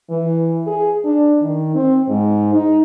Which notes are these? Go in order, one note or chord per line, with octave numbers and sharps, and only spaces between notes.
E3
G#4
D4
D#3
C4
G#2
D#4